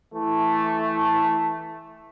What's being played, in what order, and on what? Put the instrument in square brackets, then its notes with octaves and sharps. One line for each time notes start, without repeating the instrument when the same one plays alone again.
[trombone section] E3 A3